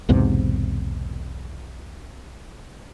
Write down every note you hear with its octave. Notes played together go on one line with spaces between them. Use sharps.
B1 E2 G#2 C3